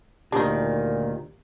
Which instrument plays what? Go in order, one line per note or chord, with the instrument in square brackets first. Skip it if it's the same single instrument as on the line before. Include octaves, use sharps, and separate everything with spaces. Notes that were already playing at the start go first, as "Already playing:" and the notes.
[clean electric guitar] D2 D#3 [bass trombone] A#2 [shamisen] D4 D#4 [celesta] G4